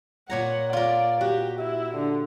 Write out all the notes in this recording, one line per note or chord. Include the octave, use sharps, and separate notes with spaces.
A#2 C#5 F#5 A#5
F4 A#4 D5
F#4 G4
E4
D3